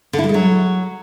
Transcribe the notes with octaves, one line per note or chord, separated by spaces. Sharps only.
D3
E4
G3
G#3
F#3